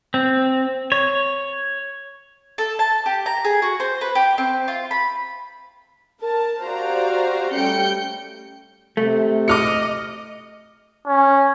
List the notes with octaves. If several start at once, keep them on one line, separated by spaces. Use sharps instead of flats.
C4
C#5
A4
A5
G4
A#5
G#4
F#4
C5
B4
G4
C4
F4
B5
A#4 A5
F#4 G4 C5 D5 F5 A#5
G3 A3 C#4 G5 G6 C#7
C3 A3
D#5 D6 F6 C#7
C#4